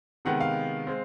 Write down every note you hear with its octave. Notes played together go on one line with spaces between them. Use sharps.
C3 D#3 G#3 B3 F#5
F5
G#3 C4